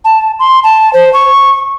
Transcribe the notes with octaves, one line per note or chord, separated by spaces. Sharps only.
A5
C6
A5
C5
C#6